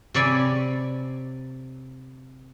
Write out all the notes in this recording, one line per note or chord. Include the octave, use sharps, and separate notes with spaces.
C3 C#5 D5 G#5 B5